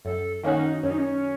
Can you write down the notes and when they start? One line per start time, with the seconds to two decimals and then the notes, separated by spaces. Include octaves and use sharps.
0.05 F#2 A4
0.43 D#3 A#3 C#4 D#4 F#4
0.83 F#2 C#4
0.91 D#4
0.98 C#4